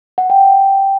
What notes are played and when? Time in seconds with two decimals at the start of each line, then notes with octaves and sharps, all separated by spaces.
0.18 F#5
0.30 G5